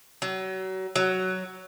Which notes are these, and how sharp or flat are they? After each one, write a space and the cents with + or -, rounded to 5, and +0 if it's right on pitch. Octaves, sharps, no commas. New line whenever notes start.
F#3 +30
F#3 +10